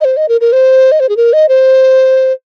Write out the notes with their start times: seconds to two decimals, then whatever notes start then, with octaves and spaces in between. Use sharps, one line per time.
0.01 D#5
0.05 C5
0.17 D#5
0.29 A#4
0.41 A#4
0.52 C5
0.92 D#5
1.00 C5
1.09 G#4
1.17 A#4
1.33 D#5
1.49 C5